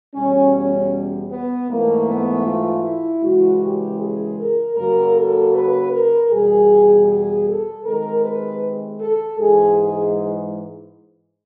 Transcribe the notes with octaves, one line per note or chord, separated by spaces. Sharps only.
E2 B2 G3 C#4
C#4
B3
G#2 E3 A3 A#3
B3
F4
E4
F#2 C#3 E3 G#3 F#4
G4
G#4
A#4
F#2 C#3 F#3 A#3 A#4
A4
B4
A#4
E2 B2 G3 G#4
G#4
A4
C3 D#3 G#3 A#4
B4
A4
G#2 E3 G#3 G#4
G#4